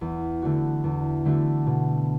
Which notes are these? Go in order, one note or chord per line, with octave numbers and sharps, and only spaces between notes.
E2
D3 A3 D4 F#4
E2
D3 A3 D4 F#4
B2